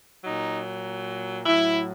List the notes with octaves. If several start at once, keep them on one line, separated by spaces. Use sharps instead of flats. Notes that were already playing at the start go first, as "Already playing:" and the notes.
A#2 F#3 D#4
A2 F#3 E4